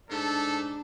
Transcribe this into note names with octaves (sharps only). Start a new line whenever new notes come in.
G#2 A3 D4 A4